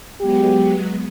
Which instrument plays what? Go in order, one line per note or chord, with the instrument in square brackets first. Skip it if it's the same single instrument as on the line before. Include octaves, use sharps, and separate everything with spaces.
[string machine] F#3 G#3 B3 [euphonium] G4